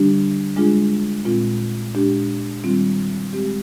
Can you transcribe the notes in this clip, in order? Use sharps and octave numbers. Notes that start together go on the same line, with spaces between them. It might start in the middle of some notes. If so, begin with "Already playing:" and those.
Already playing: D3 G3 D4 G4
G#3 D4 F4 G#4
A#2 G#3 C4 F4
A#2 G#3 D4 G4
D#3 G3 C4 F4
G#3 C4 G4